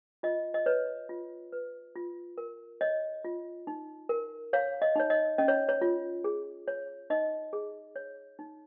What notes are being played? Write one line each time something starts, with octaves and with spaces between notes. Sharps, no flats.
F4 D#5
D#5
B4 C#5
F4
B4
F4
A#4
C#5 D#5
F4
D#4
A#4
C#5 F5
D#5
D#4 C#5
D#5
C#4 D#5
C#5
C#5
F4
G#4
C#5
D#4 D#5
G#4
C#5
D#4